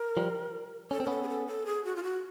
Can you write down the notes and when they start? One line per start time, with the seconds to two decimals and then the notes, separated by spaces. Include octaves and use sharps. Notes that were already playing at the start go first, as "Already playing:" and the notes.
Already playing: A#4
0.17 F3 G3
0.91 C#4 A4
1.00 C4
1.04 A#4
1.07 B3 C#4 A4
1.23 G#4
1.29 A4
1.47 A4
1.66 G#4
1.85 F#4
1.96 F4
2.03 F#4